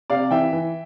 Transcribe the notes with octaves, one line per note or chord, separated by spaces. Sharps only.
C3 D5 F5
E3 E5 G5
E3